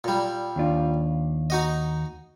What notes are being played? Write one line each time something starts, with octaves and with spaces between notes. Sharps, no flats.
A#2 G3
D#2 D4 F4
D#4 F#4 D#5